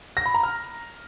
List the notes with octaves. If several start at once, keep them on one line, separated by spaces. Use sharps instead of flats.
A#6
B5
A#5
F6